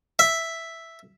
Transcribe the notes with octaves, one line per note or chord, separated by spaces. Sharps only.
E5